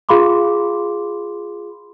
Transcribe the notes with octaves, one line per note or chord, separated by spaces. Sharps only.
F4 G#4 F5 B5 C6 D6